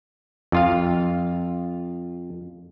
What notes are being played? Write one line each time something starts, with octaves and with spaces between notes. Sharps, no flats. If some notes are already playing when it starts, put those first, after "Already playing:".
F2 F4 F5